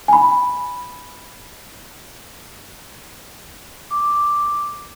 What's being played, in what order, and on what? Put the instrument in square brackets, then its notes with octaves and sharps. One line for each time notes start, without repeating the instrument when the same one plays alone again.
[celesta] G#5 B5
[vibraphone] D6